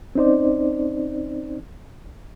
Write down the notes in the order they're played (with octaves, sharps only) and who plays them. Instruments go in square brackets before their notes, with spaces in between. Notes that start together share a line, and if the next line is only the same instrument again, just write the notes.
[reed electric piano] C4 C#4 D#4 C5 D5